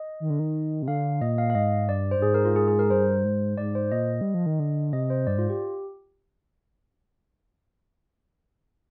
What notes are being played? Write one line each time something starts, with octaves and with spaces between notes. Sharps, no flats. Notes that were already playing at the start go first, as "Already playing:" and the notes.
Already playing: D#5
D#3
D3
D#3
C3
D3 F5
A#2 D#5
F5
F5
G#2 D#5
G2 D5
C5
G2
G#2 G#4
A#4
F4
G#4
G#4
A#4
G2 C5
G#2
G#2 D5
C5
A#2 D#5
G3
F3
D#3
D3
C3 D#5
C5
G2 D5
G#2 F4
G4